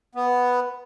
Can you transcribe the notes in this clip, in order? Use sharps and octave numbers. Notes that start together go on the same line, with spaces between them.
B3